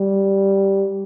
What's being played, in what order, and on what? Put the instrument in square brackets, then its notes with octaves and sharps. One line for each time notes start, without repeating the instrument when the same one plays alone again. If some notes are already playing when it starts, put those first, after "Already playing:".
Already playing: [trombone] G3